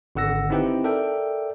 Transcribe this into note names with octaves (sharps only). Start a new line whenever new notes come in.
G#1 D3 F#5 E6 A#6
C4 D#4 E4 G4 B4 G5
A4 A#4 D5 E5 G5